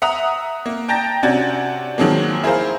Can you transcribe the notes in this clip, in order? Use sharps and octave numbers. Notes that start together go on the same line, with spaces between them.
E5 F#5 A#5 D#6 F7
A#3
G5 A5 A#5 G6 A6 A#6
C3 C#4 D4 F#4 G#6 A6
D#3 F3 F#3 G#3 A#3
E4 G#4 A#4 C5 F5